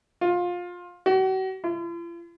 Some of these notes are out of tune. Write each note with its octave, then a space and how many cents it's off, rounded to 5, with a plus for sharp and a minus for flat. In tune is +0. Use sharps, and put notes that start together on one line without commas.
F4 +20
F#4 +40
F4 -45